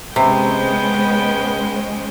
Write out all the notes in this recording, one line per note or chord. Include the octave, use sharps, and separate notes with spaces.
C3 G#3 B3 C#4 C5 G5